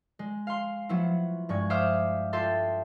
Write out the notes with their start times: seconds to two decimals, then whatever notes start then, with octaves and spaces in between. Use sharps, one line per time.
0.19 G#3
0.47 F5 C6
0.89 F3 F#3 B3 E4
1.49 G2 G#3 C#6 G#6
1.70 C5 E5 F5 D6 D#6 F6
2.33 F4 G4 A4 E5 C6 A6